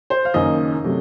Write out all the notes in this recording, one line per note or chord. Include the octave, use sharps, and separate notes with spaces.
C5
F5
F#1 F#2 D#3 A#3 D#5
C3 F#3 A3